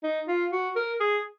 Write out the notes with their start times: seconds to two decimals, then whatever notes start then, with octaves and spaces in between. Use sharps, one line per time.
0.04 D#4
0.28 F4
0.52 F#4
0.76 A#4
1.00 G#4